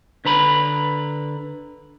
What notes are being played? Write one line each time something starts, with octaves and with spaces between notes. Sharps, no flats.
D3 B4 A#5 B5